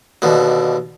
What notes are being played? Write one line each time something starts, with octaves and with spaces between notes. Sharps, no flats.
D#2 B2 D3